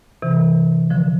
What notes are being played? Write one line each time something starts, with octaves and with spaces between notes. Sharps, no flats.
C3 E3
D3 F3